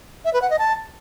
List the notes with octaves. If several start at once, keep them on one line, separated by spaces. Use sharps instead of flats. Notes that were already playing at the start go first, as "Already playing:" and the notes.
E5
B4
F#5
D#5
A5